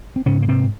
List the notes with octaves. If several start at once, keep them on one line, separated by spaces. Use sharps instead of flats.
C4
G#2 C#3 C#4
A#3
C3 C4